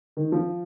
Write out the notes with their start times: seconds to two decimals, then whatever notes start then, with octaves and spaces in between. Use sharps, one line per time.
0.17 D#3
0.32 F3